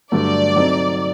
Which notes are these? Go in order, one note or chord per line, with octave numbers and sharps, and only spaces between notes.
G2 D3 F#3 A3 D5
C3 F#3 C4 D#4 A4